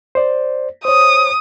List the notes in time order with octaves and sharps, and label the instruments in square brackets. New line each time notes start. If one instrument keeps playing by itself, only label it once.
[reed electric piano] C5 D5
[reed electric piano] C5 C#5 [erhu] D#6